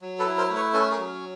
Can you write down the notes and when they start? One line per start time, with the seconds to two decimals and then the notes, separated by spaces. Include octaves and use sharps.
0.01 F#3
0.19 A4 B4
0.25 E4
0.37 A#4 C5
0.49 A3
0.55 B4 C#5
0.73 C#4 A4 B4
0.91 G#4 A#4
0.97 F#3